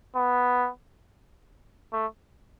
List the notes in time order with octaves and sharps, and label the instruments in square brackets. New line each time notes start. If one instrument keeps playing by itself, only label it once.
[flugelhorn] B3
A3